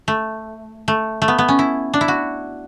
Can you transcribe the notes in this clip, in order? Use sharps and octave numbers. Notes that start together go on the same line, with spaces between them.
A3
A3
A3
B3
B3
C#4
E4
D4
E4
F#4